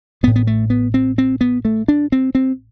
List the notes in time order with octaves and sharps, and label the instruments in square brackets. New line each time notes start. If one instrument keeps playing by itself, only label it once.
[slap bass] A1 B3
A2
B3
A3
B3
C4
C4
B3
A3
D4
C4
C4